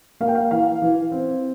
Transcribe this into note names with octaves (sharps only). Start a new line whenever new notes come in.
A#3 F5
G5
F5
E3 F5
E3
C4